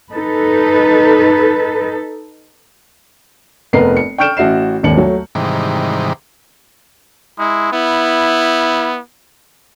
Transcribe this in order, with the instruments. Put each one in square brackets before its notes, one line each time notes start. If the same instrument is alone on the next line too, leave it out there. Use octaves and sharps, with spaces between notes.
[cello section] D#4 A4 B4
[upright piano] F1 B3 A#4 B4 C7
C#7
G5 C#6 F6 G6 D7 E7
A1 F#4 E5 C7 E7
D#1 G#1 D#2 C#7 F#7
F#3 A3
[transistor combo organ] G#2 C3 D#3 E3 G3
[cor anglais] G#3 [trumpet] E4
[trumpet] B3 [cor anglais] E4